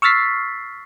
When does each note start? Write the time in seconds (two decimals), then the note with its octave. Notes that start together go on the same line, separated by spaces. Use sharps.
0.02 C#6 E6 F6 A6 B6 C7